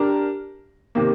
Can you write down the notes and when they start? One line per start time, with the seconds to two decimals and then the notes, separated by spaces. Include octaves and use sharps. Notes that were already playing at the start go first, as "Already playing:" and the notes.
Already playing: D4 G4 A#4
0.95 C3 D#3 A#3